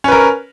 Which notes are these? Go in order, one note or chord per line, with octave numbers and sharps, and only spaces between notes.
C#4 A#4 B4